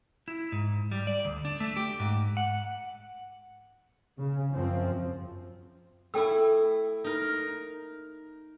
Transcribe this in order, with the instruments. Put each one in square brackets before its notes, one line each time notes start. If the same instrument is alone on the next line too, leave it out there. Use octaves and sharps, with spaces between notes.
[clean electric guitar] E4
G#2
G3
D5
D2
D4
A3
G4
G#2
F#5
[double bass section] C#3
F#2 F3 C4
[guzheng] A3 E4 [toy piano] A4 G5 E6
[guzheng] D#4 A#4